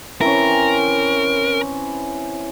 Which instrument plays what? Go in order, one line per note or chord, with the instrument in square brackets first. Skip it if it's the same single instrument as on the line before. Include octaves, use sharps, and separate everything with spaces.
[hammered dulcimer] E3 C4 C#4 [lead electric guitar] A#4